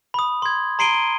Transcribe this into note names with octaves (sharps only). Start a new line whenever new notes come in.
B5 D#6
C6 G#6
A#5 C6 C7 D7 D#7 G7